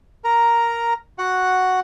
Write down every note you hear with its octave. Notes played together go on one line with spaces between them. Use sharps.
A#4 A#5
F#4 F#5